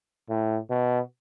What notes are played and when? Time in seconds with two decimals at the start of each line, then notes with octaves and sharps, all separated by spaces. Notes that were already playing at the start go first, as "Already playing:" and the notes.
0.30 A2
0.71 B2